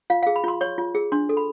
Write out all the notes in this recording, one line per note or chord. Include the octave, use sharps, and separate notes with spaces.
F4 F5
G#4 F5
B5
F4 C6
C#5 C#6
F4
G#4
D4 C6
A4
B5